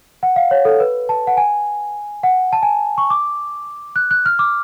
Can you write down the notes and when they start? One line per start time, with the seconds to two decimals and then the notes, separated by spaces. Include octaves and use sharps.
0.23 F#5
0.36 F5
0.51 C#5
0.65 A4
0.80 B4
1.09 A5
1.27 F#5
1.37 G#5
2.23 F#5
2.53 A5
2.63 G#5
2.98 C#6
3.10 D6
3.96 F#6
4.11 F#6
4.26 F6
4.39 D6